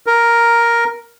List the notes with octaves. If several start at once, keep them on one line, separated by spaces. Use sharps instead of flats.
A#4